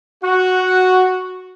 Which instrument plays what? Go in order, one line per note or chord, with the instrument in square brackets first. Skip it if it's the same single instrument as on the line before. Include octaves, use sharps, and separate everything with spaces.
[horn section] F#4